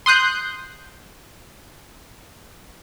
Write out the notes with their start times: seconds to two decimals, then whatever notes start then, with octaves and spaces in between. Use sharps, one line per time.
0.06 C6 D#6 F#6 G6